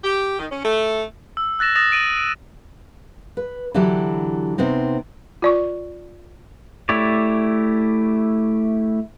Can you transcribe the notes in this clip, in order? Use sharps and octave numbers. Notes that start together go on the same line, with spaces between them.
G4
D#3
C#4
A3
E6
E6 F#6 A6 A#6 E7
D#6 A6 A#6 E7
A#6 D7 D#7 F#7
D7
B4
D3 E3 F#3 E4 G4
C3 B3 C4 D#4
F4 D5 C#6
A3 E4 G4 C#5 D5